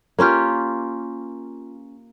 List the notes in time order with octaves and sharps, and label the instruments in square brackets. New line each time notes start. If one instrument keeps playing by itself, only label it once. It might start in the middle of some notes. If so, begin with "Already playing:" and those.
[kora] A#3 C#4 F4 G4